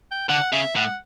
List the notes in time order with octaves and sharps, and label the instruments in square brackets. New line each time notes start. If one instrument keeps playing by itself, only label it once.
[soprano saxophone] G5
[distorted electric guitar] D3 [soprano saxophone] F#5
[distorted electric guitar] C#3 [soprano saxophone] E5
[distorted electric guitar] A2 [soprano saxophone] F#5